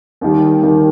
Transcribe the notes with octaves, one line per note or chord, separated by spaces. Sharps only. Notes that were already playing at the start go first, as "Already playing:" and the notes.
D#2 D#3 G3
D#2 D#3 G3